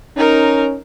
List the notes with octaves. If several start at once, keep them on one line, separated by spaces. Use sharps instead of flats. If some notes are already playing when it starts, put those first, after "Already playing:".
C#4 D#4 A#4